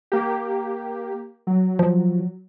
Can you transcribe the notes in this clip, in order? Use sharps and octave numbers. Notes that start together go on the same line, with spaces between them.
A#3 G4
F#3
F3